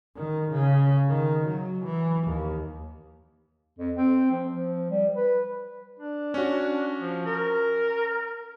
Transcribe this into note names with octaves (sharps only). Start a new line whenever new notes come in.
D#3
C#3
D#3
F#3
E3
D#2
F2
C4
F3
F3
G3
B4
D4
C#4 F#4
F3
A#4